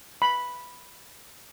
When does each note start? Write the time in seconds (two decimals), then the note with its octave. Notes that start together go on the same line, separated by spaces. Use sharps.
0.22 B5